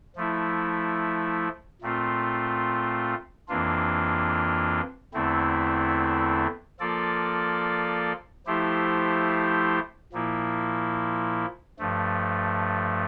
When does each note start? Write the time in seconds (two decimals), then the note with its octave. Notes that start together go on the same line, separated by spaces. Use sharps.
0.16 F3 A3 E4
1.82 A#2 A3 C4 F4
3.48 F2 E3 A#3 D4 F4
5.14 E2 D3 A3 C4 E4
6.80 F3 A#3 F4 A4 D5
8.46 F3 A3 E4 G4 C5
10.13 A#2 F3 A#3 E4
11.79 G2 F3 A3